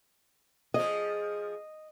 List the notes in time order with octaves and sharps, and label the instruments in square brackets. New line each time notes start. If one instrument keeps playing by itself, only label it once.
[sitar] F3 G#4 [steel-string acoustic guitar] D#5